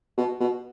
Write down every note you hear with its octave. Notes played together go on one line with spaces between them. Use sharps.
B2
B2